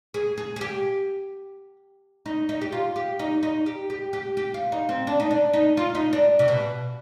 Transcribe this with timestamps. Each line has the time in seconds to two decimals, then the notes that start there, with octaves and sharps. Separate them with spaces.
0.14 G#4
0.38 G#4
0.56 G#4
0.61 G4
2.26 D#4
2.49 D#4
2.61 G4
2.72 F4
2.96 G4
3.19 D#4
3.43 D#4
3.66 G4
3.90 G4
4.13 G4
4.37 G4
4.54 F4
4.72 D#4
4.89 C4
5.07 D4
5.20 D#4
5.31 D4
5.53 D#4
5.77 F4
5.95 D#4
6.13 D4
6.39 C3
6.48 B2